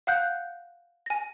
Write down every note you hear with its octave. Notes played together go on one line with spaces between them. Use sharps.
F5 F#5 F#6 G6
G#5 A#6